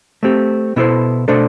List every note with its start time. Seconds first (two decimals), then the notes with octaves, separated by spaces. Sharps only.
0.23 A3 C4 G4
0.76 B2 B3 E4 A4 C5
1.28 B2 A3 D4 A4 C5